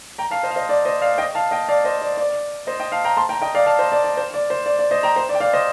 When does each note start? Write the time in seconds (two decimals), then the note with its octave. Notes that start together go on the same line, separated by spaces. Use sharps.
0.18 G5 A#5
0.31 F5 A5
0.43 C5 D#5
0.51 F5
0.56 C5 D#5
0.69 D5
0.85 C5 D#5
1.02 D5 F5
1.18 D#5 G5
1.35 F5 A5
1.51 D#5 G5
1.69 D5 F5
1.85 C5 D#5
2.02 D5
2.17 D5
2.67 C5 D#5
2.80 D#5 G5
2.92 F5 A5
3.05 G5 A#5
3.17 A5 C6
3.29 G5 A#5
3.42 D#5 G5
3.55 D5 F5
3.66 F5 A5
3.79 C5 D#5
3.92 D5
4.04 D5
4.17 C5
4.34 D5
4.50 C5
4.66 D5
4.79 D5
4.91 C5 D#5
5.03 G5 A#5
5.16 C5
5.29 D5
5.35 G5
5.40 D5 F5
5.53 C5 D#5